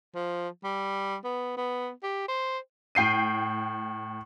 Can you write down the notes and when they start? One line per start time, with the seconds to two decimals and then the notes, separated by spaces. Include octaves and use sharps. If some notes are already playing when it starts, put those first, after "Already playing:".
0.15 F3
0.64 G3
1.24 B3
1.57 B3
2.03 G4
2.28 C5
2.95 A2 G5 C7 D#7